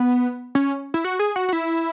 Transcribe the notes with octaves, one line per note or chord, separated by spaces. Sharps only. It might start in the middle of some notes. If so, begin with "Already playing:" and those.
Already playing: B3
C#4
E4
F#4
G#4
F#4
F#4
E4